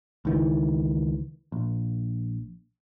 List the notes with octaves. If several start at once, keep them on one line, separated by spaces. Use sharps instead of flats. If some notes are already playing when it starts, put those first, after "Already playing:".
C#2 D#3 E3
A#1